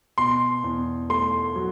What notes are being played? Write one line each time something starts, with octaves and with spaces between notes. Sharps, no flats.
B2 C6
E2
A3 C6
F#3